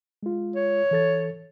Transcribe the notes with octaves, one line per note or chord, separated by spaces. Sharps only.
G#3 F4
C#5
E3 A4 A6